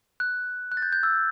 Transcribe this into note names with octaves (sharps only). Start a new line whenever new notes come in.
F#6
F#6
A6
G6
G6
E6